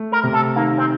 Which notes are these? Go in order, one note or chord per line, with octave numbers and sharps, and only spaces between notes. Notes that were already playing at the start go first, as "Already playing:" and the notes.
Already playing: A3
A#4
C3
A4
D#3 A#3
C4